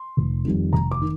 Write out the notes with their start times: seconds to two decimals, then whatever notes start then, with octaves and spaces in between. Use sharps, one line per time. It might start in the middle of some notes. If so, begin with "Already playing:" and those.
Already playing: C6
0.17 F1
0.45 F2 D#3 G3
0.73 F1 A#5
0.91 D6
1.01 D#3